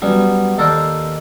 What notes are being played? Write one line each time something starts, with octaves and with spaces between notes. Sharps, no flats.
F#3 G3 B3 C#4
D#2 A4 A#4 C5 D5